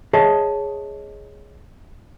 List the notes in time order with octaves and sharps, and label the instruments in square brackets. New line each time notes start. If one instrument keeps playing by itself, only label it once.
[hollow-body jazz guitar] G#4 C#5 D#5 E5 A5